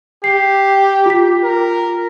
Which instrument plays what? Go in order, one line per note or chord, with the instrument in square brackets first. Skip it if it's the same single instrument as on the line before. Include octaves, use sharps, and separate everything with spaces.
[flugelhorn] G4 [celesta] C7
[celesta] F4 B6
[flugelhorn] A#4